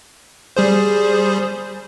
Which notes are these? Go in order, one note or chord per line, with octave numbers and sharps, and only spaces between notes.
G3 G#4 C5